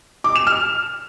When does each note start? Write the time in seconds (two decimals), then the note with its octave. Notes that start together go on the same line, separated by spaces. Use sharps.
0.24 D6
0.36 E7
0.47 F6